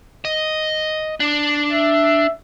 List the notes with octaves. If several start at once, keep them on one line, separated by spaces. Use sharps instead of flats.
D#5
D4
E5